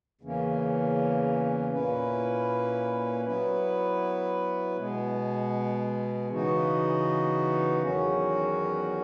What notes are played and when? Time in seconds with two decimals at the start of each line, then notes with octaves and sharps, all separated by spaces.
0.21 E2 C#3 E3 A#3 C#4
1.73 A#2 A#3 C#4 E4 B4
3.25 F#3 B3 E4 B4
4.77 B2 G#3 B3
6.30 C#3 E3 B3 D#4 F#4
7.81 E2 D#3 F#3 C#4 F#4